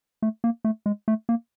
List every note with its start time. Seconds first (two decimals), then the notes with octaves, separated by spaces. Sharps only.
0.22 A3
0.44 A#3
0.64 A3
0.86 G#3
1.08 A3
1.29 A#3